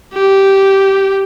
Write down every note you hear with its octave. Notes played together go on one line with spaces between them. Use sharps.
G4